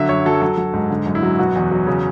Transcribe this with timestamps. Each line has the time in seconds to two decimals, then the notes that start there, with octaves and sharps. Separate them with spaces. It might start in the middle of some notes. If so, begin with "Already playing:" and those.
Already playing: D3 F#3 E5
0.09 F#2 C#5
0.26 F#3 A4
0.42 F#3 A4
0.58 F#3
0.73 G#2
0.90 D3
1.06 F#2
1.15 E4
1.23 F#3
1.38 B2 F#4
1.55 E2
1.71 F#3
1.87 C#3